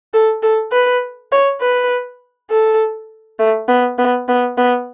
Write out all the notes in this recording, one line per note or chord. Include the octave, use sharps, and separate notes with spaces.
A4
A4
B4
C#5
B4
A4
A3
B3
B3
B3
B3